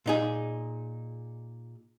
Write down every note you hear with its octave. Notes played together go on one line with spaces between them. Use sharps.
A#2 D#4 G#4